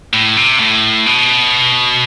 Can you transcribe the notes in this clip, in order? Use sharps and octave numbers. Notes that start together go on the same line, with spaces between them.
A2
C3
A2
B2